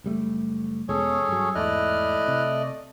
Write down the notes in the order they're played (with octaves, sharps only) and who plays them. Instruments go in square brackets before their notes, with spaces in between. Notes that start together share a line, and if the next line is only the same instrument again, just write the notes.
[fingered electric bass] F#1 G3 A3
[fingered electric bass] E2 B2 G#3 [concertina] C#4 G#4 A4 [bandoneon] C#5
[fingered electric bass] G2 F#3
[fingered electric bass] E2 G#2 [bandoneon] A3 D5 D#5 [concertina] E4 F6 F#6
[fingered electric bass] C3